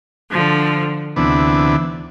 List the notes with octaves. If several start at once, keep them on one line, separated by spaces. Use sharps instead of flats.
D3 F3
D2 C3 E3 B3 D4